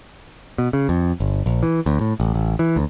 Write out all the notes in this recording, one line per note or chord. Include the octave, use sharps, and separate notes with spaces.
B2
C#3
F2
G1
A#1
E3
D2
A2
A1
A1
E3
D2